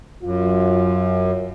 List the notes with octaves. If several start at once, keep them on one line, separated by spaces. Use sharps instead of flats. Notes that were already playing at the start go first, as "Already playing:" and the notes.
F#2 F4